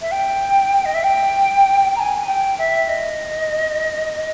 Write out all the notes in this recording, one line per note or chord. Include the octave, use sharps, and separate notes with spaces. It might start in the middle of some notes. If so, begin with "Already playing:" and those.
E5
G5
D#5
E5
G5
A#5
G#5
G5
E5
D#5